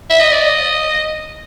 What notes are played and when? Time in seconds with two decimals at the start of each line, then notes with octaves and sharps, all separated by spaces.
0.10 E5
0.21 D#5
0.32 D5
0.42 D#5